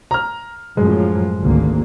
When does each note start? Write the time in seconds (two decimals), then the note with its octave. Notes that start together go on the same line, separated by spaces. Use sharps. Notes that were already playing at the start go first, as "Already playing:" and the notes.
0.11 A#5 F6
0.77 F#2 A2 F3 G#3
1.42 G#1 D2 A#3